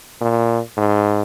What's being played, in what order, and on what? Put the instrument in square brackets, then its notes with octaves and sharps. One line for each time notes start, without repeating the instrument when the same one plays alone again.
[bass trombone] A#2
G#2